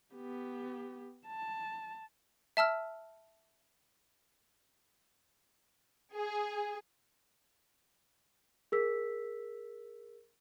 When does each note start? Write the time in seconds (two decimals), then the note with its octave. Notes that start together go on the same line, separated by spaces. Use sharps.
0.15 B3 G4
1.27 A5
2.57 E5 A5 E6 F6
6.13 G#4
8.72 G#4 A#4 E6 B6